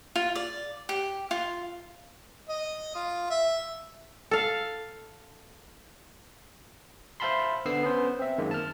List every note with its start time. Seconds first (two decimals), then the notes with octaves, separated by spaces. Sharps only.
0.16 F4
0.35 D5
0.89 G4
1.31 F4
2.49 D#5
2.95 F4
3.30 E5
4.31 A4 F5
7.20 C5 E5 F5 A5 B5 C6
7.65 D3 B3 E6 C7
7.83 B3 C#4 C5
8.19 C4 E5
8.38 F#2 D#3 G#3 A#3
8.51 A5 F6